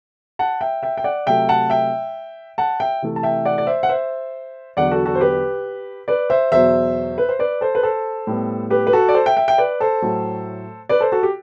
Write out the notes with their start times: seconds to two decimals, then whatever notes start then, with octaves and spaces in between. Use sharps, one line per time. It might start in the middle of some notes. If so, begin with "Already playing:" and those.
0.39 F#5 A5
0.61 E5 G5
0.83 E5 G5
0.97 G5
1.04 D5 F#5
1.27 C3 F#3 A3 E5 G5
1.49 F#5 A5
1.70 E5 G5
2.58 F#5 A5
2.80 E5 G5
3.02 C3 E3 A3
3.16 A5
3.23 E5 G5
3.45 D5 F#5
3.58 D5
3.67 C5 E5
3.83 F#5
3.89 C5 E5
4.77 E2 D3 F#3 D5 F#5
4.91 F#4 A4
5.06 F#4 A4
5.15 C5
5.20 G4 B4
6.08 B4 D5
6.30 C5 E5
6.52 E2 B2 F#3 C5 E5
7.18 B4
7.29 C5
7.39 B4 D5
7.61 A4 C5
7.75 B4
7.83 A4 C5
8.27 A2 G3 B3
8.70 G4 B4
8.87 B4
8.93 F#4 A4
9.09 D5
9.14 A4 C5
9.26 E5 G5
9.37 E5 G5
9.48 E5 G5
9.58 B4 D5
9.80 A4 C5
10.02 A2 F#3 A3
10.89 B4 D5
11.00 A4 C5
11.12 F#4 A4
11.23 G4